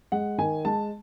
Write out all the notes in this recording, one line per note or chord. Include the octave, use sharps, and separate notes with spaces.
G#3 F#5
D#3 G#5
G#3 A5